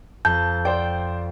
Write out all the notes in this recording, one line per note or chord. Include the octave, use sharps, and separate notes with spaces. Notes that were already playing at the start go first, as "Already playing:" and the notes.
F2 A5 G6
C5 D5 G5